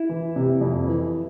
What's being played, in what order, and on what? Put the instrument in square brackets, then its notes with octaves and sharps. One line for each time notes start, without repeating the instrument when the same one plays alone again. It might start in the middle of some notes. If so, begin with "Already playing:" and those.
Already playing: [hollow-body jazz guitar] E4
[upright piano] E3
C3
F2
E3